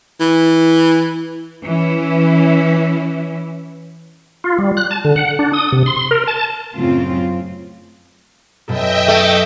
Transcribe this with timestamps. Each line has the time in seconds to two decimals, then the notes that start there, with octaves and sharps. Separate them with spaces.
0.20 E3
1.64 E3 C#4 E4
4.44 F4
4.58 G3
4.77 F#6
4.91 A5
5.05 D3
5.16 F#5
5.39 D4
5.53 D#6
5.72 C3
5.86 C6
6.11 A#4
6.27 A5
6.77 F#2 A2 C#3 C4 F4
8.68 F#2 B2 A4 D#5 E5 G5
9.08 A3